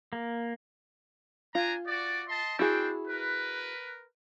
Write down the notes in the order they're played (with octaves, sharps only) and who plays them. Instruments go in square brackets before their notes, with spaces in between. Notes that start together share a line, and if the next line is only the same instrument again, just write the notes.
[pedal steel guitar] A#3
[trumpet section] D4 G#5 A#5 [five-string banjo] F4
[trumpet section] F#4 D5
D#5 A5 C6
[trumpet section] C4 D4 G5 [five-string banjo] E4 F#4 G#4
[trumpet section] A#4 B4